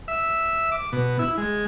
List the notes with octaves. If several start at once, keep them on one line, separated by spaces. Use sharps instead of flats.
E5
D6
B2
E4
G#3